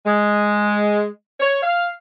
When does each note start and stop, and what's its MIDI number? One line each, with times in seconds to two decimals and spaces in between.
0.05 1.05 56
1.40 1.61 73
1.62 1.89 77